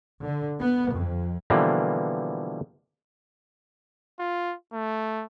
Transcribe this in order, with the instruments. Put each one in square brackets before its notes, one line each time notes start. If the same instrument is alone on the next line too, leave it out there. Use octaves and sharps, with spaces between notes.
[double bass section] D3
B3
F2
[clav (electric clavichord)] B2 D3 E3 F3 G3 A#3
[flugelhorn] F4
A3